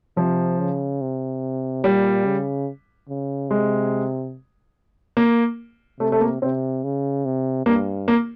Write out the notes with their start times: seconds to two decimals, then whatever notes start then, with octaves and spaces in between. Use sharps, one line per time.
0.17 C3 F3
0.59 C#3
1.01 C3
1.84 A#2 G3
2.25 C#3
3.09 C#3
3.50 C3 G#3
5.17 A#3
6.00 C3 A3
6.12 A3
6.20 A#3
6.42 C3 C4
6.84 C#3
7.25 C3
7.66 G2 A#3
8.08 A#3